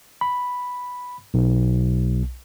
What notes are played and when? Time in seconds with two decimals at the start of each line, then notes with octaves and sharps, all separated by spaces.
0.21 B5
1.34 B1